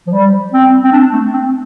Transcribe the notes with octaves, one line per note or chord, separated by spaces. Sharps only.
F3
G3
C4
C4
D4
A3
C4